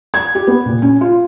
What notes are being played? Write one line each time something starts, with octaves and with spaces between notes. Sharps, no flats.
G#6
G4
B3
A#2
C#4
F4